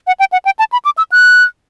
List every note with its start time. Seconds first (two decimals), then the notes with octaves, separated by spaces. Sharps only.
0.07 F#5
0.20 G5
0.32 F#5
0.45 G5
0.59 A5
0.72 B5
0.85 D6
0.98 E6
1.12 F#6